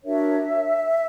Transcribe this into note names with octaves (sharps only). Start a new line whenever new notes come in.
D4 F#4 A#4 C#5 E5